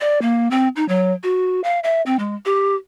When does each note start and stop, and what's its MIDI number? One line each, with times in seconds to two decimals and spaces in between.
0.01 0.21 74
0.22 0.50 58
0.51 0.68 60
0.76 0.87 63
0.88 1.13 54
1.23 1.61 66
1.64 1.79 77
1.84 2.02 76
2.06 2.17 60
2.19 2.35 56
2.45 2.75 67